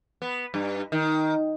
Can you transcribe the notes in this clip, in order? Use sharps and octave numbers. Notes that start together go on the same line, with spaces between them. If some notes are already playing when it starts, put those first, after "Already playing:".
B3
G2
D#3